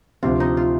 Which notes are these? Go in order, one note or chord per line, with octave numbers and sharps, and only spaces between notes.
D2 C3 F3 C4 F4 G4
D#4
F4